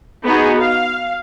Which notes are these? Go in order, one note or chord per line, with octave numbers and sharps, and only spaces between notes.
B3 D#4 F#4 G#4
F5